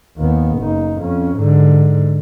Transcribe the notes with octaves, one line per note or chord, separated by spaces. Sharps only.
D#2 B3
F#1 D#4
F2 C#4
G#2 D3